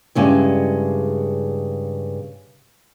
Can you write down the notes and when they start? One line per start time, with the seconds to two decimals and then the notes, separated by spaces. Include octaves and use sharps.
0.15 G2 C#3 G#3 E4